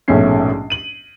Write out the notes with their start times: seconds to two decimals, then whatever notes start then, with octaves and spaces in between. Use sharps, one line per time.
0.08 A#1 G#2 B2 A3 C#4 C7
0.70 D#7 F#7